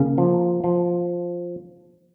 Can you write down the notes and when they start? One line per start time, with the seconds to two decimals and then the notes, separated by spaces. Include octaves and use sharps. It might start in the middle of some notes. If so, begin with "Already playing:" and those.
Already playing: C#3 A#3
0.18 F3
0.64 F3